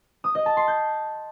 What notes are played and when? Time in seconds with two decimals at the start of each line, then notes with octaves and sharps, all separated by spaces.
0.24 D#6
0.35 D#5
0.46 A5
0.57 C6
0.68 G6